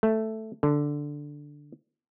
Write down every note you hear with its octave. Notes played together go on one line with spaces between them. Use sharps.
A3
D3